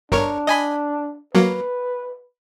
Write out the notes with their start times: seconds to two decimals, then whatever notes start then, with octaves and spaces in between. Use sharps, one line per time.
0.12 G1 D4 A#4 C#5
0.47 D#5 G#5 B5
1.35 F#3 A#3 B4